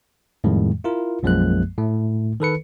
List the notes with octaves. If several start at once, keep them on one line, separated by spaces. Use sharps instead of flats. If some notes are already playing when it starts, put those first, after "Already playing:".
F2 A2 D#3 G3 G#3
E4 F4 A#4
B1 F#2 F3 G#3 A#3 F#6
A2 A3
D#3 A4 B4 C#7